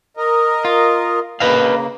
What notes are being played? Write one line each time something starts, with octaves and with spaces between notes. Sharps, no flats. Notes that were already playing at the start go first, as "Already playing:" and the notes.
A#4 D#5
F4
C#3 A#3 B4 D#5 F5